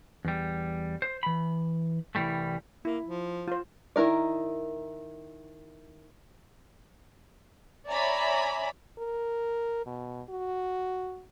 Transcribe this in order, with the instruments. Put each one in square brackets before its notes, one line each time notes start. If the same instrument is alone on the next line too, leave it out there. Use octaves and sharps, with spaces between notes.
[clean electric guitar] E2 G3
C5
E3 B5
C2 F#2 E3 G3 A3
[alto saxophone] A#3 [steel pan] E4
[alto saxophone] F3
[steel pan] F4 C5
[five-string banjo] D#3 E4 A#4 D5
[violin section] C#5 D5 E5 G#5 A#5 B5
[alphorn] A#4
B2
F#4